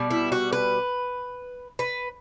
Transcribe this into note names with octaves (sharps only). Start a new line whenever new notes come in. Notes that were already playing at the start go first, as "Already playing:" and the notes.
Already playing: B2 G3
E4
F#4
B4
B4